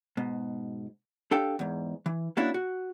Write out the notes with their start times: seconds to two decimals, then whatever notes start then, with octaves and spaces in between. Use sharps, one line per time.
0.17 G#2 B2
1.31 D4 G4 A4 F5 G5
1.59 E2 G#2
2.06 E3
2.37 A#3 C#4 D4 E4 F#4
2.54 F#4